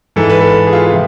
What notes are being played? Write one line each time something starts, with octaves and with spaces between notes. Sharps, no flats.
G#2 E3 A4
B4
A4
G#4
F4
C3 F3